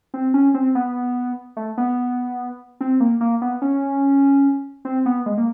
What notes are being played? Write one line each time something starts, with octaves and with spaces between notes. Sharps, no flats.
C4
C#4
C4
B3
A3
B3
C4
A#3
A#3
B3
C#4
C4
B3
G#3
A#3